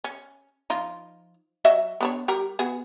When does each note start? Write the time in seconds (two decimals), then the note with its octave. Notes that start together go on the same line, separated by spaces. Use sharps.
0.04 C#4
0.70 F3 D#4 F4
1.65 F#3 D#5 E5
2.01 B3 D4 C#5
2.28 G3 G4 A#4
2.59 B3 F#4 G#4